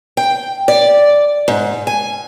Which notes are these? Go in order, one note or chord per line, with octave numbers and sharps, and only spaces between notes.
G5
D5
G#2
G#5